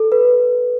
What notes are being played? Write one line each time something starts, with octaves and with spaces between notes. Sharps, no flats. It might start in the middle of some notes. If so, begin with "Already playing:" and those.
Already playing: A4
B4